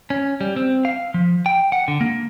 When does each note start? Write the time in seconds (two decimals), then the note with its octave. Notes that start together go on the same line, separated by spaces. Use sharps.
0.10 C#4
0.41 G3
0.56 C4
0.85 F5
1.14 F3
1.46 G5
1.72 F#5
1.88 D3
2.01 A#3